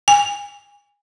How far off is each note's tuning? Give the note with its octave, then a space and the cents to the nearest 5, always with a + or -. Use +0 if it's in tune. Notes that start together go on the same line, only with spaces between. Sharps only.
G#5 -25